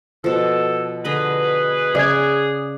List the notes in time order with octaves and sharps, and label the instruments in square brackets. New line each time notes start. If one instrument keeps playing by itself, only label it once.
[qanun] B2 F3 [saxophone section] A4
[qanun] D3 D#5 B5 [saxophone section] G#4 B4
[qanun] C#3 [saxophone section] G#4 [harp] D5 F#6 G#6